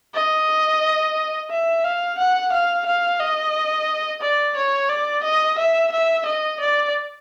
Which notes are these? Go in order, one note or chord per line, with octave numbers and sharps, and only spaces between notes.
D#5
E5
F5
F#5
F5
F5
D#5
D5
C#5
D5
D#5
E5
E5
D#5
D5